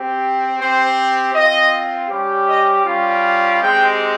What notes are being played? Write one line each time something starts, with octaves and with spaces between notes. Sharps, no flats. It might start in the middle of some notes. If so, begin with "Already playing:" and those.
Already playing: C4 G4
C4 G4 C5
C4 F4 D#5
G3 C#4 G4
D#5
G3 C#4 F4
G#3 C4 D#4 G4 G5